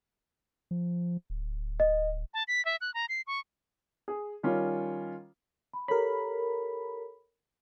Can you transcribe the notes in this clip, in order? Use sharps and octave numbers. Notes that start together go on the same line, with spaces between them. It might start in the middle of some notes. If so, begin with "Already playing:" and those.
F3
D1
D#5
A5
B6
E5
F#6
A#5
C7
C#6
G#4
D#3 G3 C#4 F4
B5
G4 A4 A#4 C#5 B5